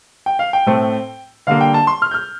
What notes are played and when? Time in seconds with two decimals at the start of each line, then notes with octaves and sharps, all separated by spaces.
0.26 G5
0.39 F5
0.53 G5
0.66 A2 A3 C4
1.47 D3 G3 A#3 F5
1.61 G5
1.74 A5
1.87 C6
2.02 F6
2.11 G6
2.14 F6